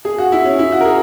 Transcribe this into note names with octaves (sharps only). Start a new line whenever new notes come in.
G#4
F#4
E4
C#4
E4
F#4
A#4
G#4